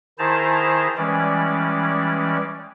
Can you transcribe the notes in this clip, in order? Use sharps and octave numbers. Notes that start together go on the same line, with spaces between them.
D#3 E4 G#4 C5 A5 A#5
E3 G3 G#3 C#4 D5